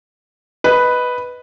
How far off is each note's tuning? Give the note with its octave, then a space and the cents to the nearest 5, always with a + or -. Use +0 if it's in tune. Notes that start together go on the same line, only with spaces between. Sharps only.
B4 +0 D#5 +0